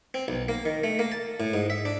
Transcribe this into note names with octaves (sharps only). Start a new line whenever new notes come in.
C4
B1
A#3
D#3
A3
A#3
A5
A2
G#2
E5
D4